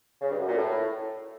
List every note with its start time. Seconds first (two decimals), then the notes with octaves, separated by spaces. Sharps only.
0.22 C#3
0.30 G2
0.39 F#2
0.48 A#2
0.57 A2